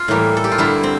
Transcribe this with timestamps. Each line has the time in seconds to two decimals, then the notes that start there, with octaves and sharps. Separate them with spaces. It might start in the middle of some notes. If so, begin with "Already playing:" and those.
Already playing: F4
0.08 A2 E3 G3 A#3
0.37 A4
0.44 G4
0.52 F4
0.58 G2 D3 G3 E4
0.83 C4